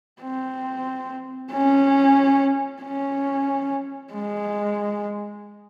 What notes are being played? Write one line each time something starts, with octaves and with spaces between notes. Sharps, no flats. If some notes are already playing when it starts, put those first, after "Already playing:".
C4
C#4
C#4
G#3